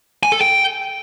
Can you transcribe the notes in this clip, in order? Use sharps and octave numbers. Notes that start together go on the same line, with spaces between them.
G#5
A4
G5